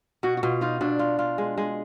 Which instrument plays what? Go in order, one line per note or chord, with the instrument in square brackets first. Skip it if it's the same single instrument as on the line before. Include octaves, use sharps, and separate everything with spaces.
[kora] B2 [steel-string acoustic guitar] F#4
[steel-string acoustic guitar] F#4
[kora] B2 [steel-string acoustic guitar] F4
[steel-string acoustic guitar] D#4 [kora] F4
[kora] B2 [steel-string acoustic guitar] D4
[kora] F4
F4
G#3
G#3